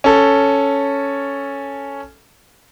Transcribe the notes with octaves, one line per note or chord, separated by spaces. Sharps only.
C#4 A4